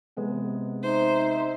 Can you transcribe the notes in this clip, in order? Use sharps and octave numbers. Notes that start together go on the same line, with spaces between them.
C3 G#3 B3
D#4 C5 E5